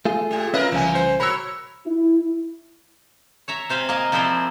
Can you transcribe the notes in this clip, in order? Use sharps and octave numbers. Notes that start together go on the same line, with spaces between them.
A3 F4 G#4
A#2 G4
C#4 F4 A#4 B4 D#5 E5
C2 C#3 E3 A#3 G#5
C5
F#4 A#4 C#5 B5 E6
E4
C#5 E5 A#5
C3 C5 F5 G#5 B5
A#3 D#5 G#5
C3 F3 C4 E4 C5 D5